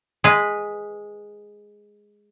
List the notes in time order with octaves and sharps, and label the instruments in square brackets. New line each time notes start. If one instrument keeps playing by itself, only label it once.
[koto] G#3 B4